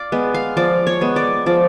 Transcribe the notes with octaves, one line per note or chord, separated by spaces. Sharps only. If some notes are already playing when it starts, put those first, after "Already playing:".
Already playing: D5 F5
G#3 B3
F5
F3 D5
C#5
G#3 B3
D5
F3 D5